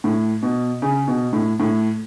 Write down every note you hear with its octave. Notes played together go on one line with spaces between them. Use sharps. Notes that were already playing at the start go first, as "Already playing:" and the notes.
A2
B2
C#3
B2
A2
A2